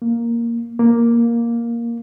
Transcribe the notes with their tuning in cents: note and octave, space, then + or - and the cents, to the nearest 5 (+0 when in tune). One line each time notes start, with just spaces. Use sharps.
A#3 +0
A#3 +5